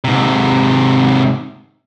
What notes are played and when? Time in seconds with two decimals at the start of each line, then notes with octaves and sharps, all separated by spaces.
0.04 G#2 C3